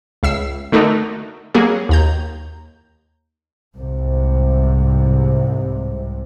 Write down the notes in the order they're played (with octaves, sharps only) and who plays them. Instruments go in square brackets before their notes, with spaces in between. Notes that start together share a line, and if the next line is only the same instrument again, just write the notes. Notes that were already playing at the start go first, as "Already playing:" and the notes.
[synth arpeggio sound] C#2 E5 E6 C7
D3 A3 D#4 F#4 A#4 D5
F#3 A#3 F#4 G#4
D#2 A#5 G6
[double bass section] C2 G#2 C3